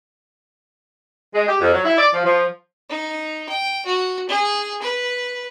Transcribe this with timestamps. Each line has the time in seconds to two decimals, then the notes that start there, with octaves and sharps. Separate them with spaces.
1.35 G#3
1.47 G4
1.61 F2
1.73 F#3
1.85 E4
1.98 D5
2.14 F3
2.25 F3
2.90 D#4
3.49 G5
3.86 F#4
4.29 G#4
4.82 B4